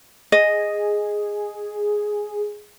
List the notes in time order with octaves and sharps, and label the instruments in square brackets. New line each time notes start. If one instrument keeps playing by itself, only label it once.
[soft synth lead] G#4 [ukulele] D#5